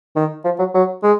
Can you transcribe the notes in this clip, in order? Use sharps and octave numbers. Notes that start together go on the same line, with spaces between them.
D#3
F3
F#3
F#3
G#3